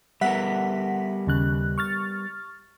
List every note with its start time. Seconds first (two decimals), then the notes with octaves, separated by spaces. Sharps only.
0.21 G3 B3 A#4 E5 F#5 B6
1.27 D#2 C#3 F#6
1.78 C#6 F6 A6